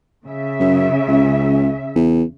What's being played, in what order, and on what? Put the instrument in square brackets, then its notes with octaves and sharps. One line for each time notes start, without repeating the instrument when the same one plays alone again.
[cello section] C#3 E5
[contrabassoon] F#2
C#2
E2